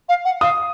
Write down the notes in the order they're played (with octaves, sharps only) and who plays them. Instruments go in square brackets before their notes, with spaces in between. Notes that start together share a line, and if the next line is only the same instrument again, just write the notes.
[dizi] F5
F#5
[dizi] F5 [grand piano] D#6